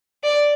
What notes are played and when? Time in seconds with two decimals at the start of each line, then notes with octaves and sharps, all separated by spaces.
0.24 D5